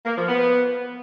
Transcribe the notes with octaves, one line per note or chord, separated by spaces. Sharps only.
A#3
F3
B3